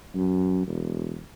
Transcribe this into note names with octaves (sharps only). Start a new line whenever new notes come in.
F#2
E1